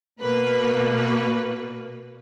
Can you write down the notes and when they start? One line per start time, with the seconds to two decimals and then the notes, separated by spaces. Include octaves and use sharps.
0.21 B2 A#3 B4
0.95 B4